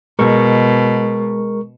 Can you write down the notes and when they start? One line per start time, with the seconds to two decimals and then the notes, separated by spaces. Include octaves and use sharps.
0.19 B2 G#3 A#4 C#6